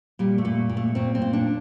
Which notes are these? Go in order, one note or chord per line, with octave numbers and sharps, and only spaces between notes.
A#2 G3
A3
A#2
A#2
A3
A#2 C4
C4
A#2
D4